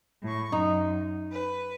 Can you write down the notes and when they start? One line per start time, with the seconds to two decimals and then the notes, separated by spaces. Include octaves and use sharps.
0.23 A2 C#6
0.52 F#2 D#4
1.31 B4